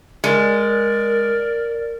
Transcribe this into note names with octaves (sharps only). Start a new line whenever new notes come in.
G#3 A#4 D5